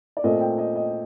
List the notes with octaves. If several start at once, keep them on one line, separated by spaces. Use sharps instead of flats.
D5
A#2 A3 C4 D#5
G5
D#5
D#5